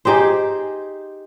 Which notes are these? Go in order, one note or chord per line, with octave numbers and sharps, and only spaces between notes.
D#4 G4 G#4 C5